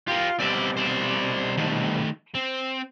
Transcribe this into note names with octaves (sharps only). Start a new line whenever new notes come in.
F4 G4 A#4
B2 G3 C4 D5 E5
C5 D5
D#3 A3
C4